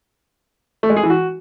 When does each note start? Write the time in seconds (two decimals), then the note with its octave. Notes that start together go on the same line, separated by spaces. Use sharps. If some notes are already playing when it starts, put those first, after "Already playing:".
0.83 A3
0.90 G#3
0.97 G#4
1.03 E3
1.10 F#4